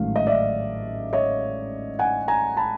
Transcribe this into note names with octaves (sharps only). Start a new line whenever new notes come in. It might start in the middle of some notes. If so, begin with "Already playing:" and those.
Already playing: A1 G#2 D#3 F#3 A3 F5
D#5
D5 E5
C#5 D#5
F#5 G#5
G#5 A#5
A5 B5